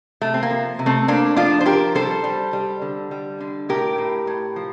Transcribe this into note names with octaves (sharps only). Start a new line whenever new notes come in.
C3 A3
C4
A#3
F3
C3
A3 C4
A3 A#3 D4
F3 D4 F4
C5
F3 G4 A#4
G3 A4 C5
G3
G3
D3
G3
D3
A2 G4 A#4
A2
A2
F3